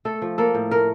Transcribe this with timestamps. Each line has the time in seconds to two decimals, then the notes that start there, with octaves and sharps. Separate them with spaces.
0.05 A3 A4
0.22 F3
0.38 A#3 A4
0.54 A2
0.71 A3 A#4